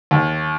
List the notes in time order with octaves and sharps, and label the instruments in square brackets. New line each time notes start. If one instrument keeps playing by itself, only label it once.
[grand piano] D#2